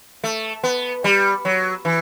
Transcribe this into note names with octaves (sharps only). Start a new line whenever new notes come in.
A3
B3
G3
F#3
E3